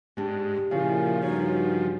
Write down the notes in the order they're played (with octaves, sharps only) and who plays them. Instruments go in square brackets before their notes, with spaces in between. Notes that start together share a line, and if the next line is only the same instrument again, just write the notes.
[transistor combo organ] G#2 [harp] D4 G4
[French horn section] A#2 E4 [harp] C#3 [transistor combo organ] F3 [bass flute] F5
[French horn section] G2 F#4 [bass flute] D#4 [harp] C#5